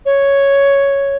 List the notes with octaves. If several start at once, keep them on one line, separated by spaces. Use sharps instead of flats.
C#5